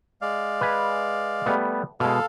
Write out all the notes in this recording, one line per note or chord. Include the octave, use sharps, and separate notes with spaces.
G#3 D5 F5
B4 G#5
G3 A3 B3
B2 G#3 A4 F5